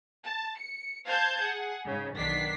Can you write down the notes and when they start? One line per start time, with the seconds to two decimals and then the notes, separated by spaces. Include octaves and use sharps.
0.24 A5
0.58 C#7
1.06 C5 F5 A5 G6 G#6
1.40 G#4 F#5
1.86 G#2 C#3
2.15 B1 D#3 D4 B6 C7